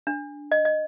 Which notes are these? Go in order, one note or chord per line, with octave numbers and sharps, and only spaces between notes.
D4
D#5
D#5